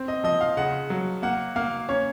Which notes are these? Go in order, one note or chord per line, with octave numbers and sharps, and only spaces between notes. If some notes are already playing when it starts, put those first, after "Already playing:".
Already playing: C4
D#5
F3 D#5
F5
C#3 F#5
F#3
A#3 F#5
A#3 F5
C#4 C#5